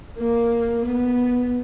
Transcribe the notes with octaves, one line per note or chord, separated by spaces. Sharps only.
A#3
B3